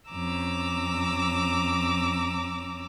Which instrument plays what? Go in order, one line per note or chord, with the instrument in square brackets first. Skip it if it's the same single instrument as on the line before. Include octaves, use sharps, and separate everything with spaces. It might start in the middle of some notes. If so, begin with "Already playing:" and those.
[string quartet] F2 C#4 A#5 D6 E6